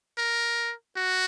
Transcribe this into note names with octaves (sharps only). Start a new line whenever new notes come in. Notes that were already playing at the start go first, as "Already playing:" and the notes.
A#4
F#4